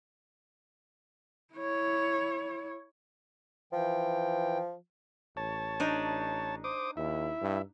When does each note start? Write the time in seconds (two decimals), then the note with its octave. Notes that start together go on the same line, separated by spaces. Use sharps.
1.54 E4 C#5
3.73 E3 F3 G5
5.37 A1 C#5 A5
5.80 D4 D#4
6.64 C5 D6 D#6
6.97 D#2 E4 E5
7.41 G2